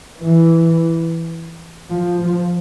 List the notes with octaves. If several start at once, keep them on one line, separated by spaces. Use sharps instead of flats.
E3
F3
F3